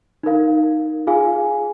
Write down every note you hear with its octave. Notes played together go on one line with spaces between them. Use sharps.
D#4 A#4 F5
F4 G#4 F5 G#5